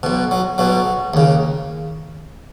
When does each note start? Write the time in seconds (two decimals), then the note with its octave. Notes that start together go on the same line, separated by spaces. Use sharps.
0.03 B1 B2
0.31 F#3
0.58 B1 B2 F#3
1.14 D#2 C#3